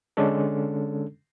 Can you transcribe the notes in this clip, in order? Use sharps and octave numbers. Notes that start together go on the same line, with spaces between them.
D3 G#3 C#4 D4 A4